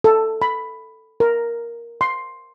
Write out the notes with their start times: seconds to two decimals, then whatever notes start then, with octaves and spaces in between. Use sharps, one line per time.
0.04 A4
0.42 B5
1.20 A#4
2.01 C6